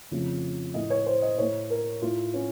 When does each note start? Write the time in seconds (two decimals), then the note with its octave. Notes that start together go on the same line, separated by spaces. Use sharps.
0.11 F2 C#3 F3 A3
0.74 A2 A3 D#5
0.90 C#5
1.06 C5
1.22 D#5
1.38 A2 A3 C#5
1.70 A#4
2.02 A2 A3 F4
2.34 C#4